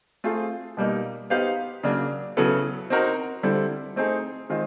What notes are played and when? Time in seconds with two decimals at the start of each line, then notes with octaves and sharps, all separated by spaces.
0.24 A3 C4 F4 G#4 C5
0.77 B2 G3 A#3 D#4
1.30 B3 D#4 G4 C5 F5
1.83 C#3 F#3 A#3 D4
2.37 C#3 F#3 B3 E4 A4
2.90 C4 D#4 F#4 A#4
3.43 D3 G3 C4 E4 A4
3.96 A3 C4 D#4 G#4
4.50 D#3 G#3 C4 F4